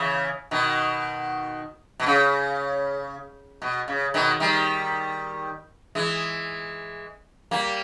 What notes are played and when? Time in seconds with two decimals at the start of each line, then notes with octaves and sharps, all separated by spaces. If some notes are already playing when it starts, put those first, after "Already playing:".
Already playing: C#3 E3
0.51 B2 D#3
2.00 B2
2.06 C#3
3.62 B2
3.88 C#3
4.14 B2 D#3
4.40 D#3 G3
5.95 E3 G#3
7.51 G3 A#3